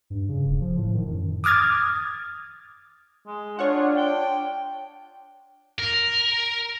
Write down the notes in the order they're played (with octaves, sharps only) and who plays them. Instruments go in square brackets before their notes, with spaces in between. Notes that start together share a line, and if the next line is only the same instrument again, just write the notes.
[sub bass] G2
C#3
D#1
F3
A2
D#3
F#2
[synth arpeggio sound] D6 D#6 F6 G#6 A6
[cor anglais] G#3
[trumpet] D4 [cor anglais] F4 [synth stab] C#5 F#5
[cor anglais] G5
[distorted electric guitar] A#4